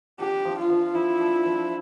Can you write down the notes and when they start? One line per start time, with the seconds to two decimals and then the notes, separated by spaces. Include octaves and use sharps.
0.19 D4 G4
0.45 F3
0.58 F4
0.70 F3
0.94 F3 E4
1.20 D4
1.45 F3